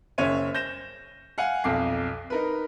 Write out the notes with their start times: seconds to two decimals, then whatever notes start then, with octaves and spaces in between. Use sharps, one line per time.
0.18 F#1 C#3 C5 C#5 E5 D#7
0.55 G6 A#6 E7
1.38 F5 F#5 G#5
1.64 B1 F2 D6 C7
2.30 D#4 A#4 B4